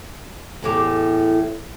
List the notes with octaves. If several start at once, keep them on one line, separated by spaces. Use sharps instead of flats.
E2 A2 G4